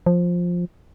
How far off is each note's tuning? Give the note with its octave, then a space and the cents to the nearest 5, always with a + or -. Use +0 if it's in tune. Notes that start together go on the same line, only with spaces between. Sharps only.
F3 +10